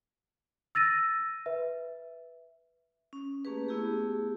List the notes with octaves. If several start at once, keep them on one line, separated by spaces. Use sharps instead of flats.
E6 A6 A#6 D#7
B4 E5
C#4
A3 A#3 C#4 G4 G#4 B4
A3 B3 E4 G4 G#4